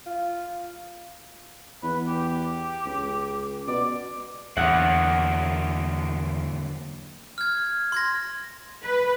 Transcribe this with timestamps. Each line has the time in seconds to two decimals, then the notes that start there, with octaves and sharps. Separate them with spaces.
0.06 F4
1.83 E2 B4
2.07 G4
2.86 C#2
3.68 B2 D5
4.57 E2 D3 F#3 A#3 F#5
7.38 F6 G#6
7.92 C6 G#6 A#6
8.85 B4